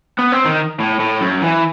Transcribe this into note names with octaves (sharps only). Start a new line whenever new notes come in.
B3
C4
D#3
A2
A2
F#2
E3